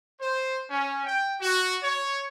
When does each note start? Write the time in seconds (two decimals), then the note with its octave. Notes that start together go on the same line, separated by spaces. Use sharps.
0.20 C5
0.69 C#4
1.05 G5
1.39 F#4
1.82 C#5